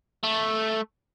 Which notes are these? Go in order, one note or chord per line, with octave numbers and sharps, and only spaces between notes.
A3